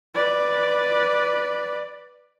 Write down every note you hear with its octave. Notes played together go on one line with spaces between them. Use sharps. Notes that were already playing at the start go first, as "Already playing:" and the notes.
B4 D5